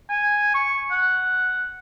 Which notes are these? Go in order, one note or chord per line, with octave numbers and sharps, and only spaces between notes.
G#5
C#6
F#5